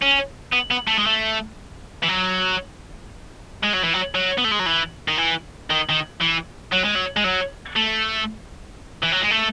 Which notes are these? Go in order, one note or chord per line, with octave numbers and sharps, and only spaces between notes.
C#4
B3
B3
A3
G#3
A3
E3
F#3
G#3
F#3
E3
F#3
F#3
B3
A3
G#3
F#3
E3
D#3
E3
D#3
D#3
E3
F#3
G#3
F#3
G#3
F#3
A3
E3
F#3
G#3
A3